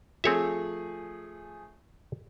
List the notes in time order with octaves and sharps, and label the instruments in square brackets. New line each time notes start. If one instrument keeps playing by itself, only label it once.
[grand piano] F3 A3 G#4 [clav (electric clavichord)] C4 C#5 E5